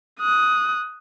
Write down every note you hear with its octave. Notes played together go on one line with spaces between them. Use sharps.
D#6 F#6